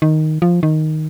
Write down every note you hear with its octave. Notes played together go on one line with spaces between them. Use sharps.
D#3
F3
D#3